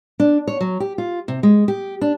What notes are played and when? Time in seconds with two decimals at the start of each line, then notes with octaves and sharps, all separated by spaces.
0.20 D4
0.47 C#5
0.61 F#3
0.80 G4
0.98 F4
1.28 C3
1.43 G#3
1.68 G4
2.01 D4